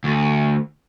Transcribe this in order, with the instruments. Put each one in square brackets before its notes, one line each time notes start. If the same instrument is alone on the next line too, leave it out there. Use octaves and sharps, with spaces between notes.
[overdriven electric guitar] D2